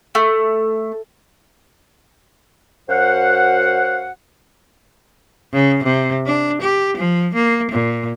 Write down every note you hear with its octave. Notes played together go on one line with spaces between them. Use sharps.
A3
F#2 F#4 C5 F5 F#5
C#3
C3
D4
G4
F3
A#3
A#2